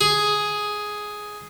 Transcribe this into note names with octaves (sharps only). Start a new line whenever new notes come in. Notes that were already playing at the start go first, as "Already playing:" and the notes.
G#4